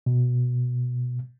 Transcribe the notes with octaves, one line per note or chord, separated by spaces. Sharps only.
B2